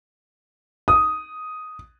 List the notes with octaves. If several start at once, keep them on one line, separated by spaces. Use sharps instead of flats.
D#6